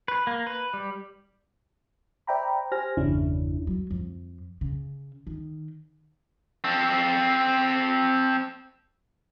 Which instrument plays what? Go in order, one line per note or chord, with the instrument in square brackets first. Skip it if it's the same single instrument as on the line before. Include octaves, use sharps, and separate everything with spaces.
[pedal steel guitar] B4
A#3
B4
G3
[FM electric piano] C5 D5 E5 G5 A#5 B5
G4 C5 G#5 F6 A#6
G1 E2 C#3 C#4 D4 E4
[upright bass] F#3
F2
C#3
D#3
[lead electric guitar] C4 A4